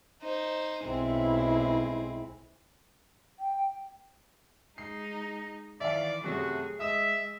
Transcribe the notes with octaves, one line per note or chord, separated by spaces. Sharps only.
D#4 C5
B1 G#3 C4 E4
G5
G#3 D#4 C7
D#3 E3 D5 E5 F5
F#2 C3 A3 F#4 G#4
G#3 D#5 E5 D#6